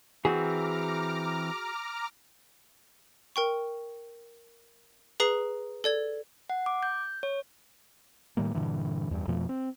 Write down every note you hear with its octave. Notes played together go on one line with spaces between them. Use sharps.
E3 C4 F#4 G#4 A#5 D6 F6
A#4 G5 C#6
G#4 B4 A#5 D#6 C7 F#7
A4 D5 G#6
F#5
D6
G6
C#5
A2 D#3 G3 A#3
G2 A#2 D3 E3
E2 G2
F2 B2 F3 A3
C4